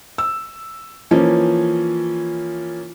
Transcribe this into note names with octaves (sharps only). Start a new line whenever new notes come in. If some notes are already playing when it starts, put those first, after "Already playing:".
E6
E3 F3 A#3 C#4